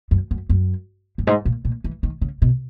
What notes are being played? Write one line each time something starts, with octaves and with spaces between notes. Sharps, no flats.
F#2
F#2
F#2
F#2
G#2
A#2
A#2
E3
D#3
C#3
B2